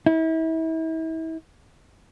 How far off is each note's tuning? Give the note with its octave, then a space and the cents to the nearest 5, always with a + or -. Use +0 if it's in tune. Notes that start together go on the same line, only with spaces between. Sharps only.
E4 -35